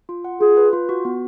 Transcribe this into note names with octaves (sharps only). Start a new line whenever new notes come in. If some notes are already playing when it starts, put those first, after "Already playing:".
F4
F#5
F4 G#4
B4
F4
F#4
B3